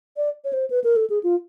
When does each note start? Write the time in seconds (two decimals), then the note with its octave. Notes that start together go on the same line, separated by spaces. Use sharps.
0.17 D5
0.44 C#5
0.53 C5
0.70 B4
0.84 A#4
0.96 A4
1.10 G#4
1.23 F4